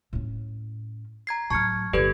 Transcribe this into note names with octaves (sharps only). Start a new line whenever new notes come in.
A2 C#4
A#5 G#6 C7
A2 F#3 A5 C#6 F6 G#6 C#7
G1 G2 G4 A4 B4 D5 G#6